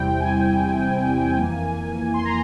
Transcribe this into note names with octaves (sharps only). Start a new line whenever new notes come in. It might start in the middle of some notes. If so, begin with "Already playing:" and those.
Already playing: E2 C3 G3 C4 E4 G5
G#5
F2 E3 A#3
C6
A#5